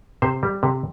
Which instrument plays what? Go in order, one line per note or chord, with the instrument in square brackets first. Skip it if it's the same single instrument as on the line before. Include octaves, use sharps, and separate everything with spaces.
[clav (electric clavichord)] C3 C5
G3
C3